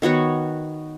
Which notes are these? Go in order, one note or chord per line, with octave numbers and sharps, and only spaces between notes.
D#3 B3 F#4 C#5